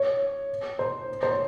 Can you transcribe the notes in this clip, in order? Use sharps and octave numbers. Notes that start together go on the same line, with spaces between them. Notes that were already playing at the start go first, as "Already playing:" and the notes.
Already playing: C#5
C5
C5
C#5